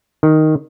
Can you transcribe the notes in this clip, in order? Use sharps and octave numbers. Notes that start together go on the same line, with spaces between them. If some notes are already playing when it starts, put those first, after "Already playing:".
D#3